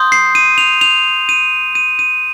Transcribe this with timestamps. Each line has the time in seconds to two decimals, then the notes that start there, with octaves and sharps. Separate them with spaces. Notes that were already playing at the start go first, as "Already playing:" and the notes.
Already playing: C6 D#6 G6
0.12 C7
0.35 D#7
0.58 F7
0.81 F7
1.29 D#7
1.75 D#7
1.99 D#7